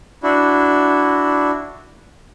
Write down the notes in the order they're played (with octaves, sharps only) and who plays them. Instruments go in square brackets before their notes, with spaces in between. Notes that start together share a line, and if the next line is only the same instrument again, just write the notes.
[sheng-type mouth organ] D4 E4 F#4